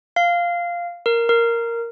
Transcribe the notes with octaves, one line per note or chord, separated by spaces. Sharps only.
F5
A#4
A#4